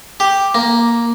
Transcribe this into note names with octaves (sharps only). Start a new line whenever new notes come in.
G4
A#3